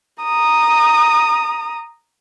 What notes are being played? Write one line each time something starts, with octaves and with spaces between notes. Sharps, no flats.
A#5 D#6